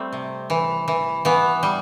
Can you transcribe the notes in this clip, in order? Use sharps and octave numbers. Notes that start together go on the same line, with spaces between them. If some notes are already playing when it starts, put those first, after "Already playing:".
Already playing: G3 A3 C4
C3
E3
E3
E3 B3
G3